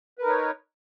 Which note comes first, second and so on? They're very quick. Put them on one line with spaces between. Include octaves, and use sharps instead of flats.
B4 A#4 D#4 C#5